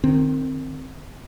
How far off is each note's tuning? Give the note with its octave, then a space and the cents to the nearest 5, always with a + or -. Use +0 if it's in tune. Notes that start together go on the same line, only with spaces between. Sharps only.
D#3 -25 C4 +0